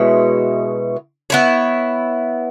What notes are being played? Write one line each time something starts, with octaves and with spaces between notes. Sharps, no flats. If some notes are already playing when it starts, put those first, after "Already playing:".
Already playing: B2 G#3 E4 C#5
B3 E4 C#5